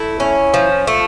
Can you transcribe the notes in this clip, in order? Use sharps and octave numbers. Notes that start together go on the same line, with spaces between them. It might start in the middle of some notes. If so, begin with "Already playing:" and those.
Already playing: A3 E4
C#4
F3
A3